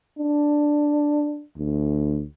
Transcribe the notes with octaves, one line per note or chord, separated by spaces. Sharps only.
D4
D2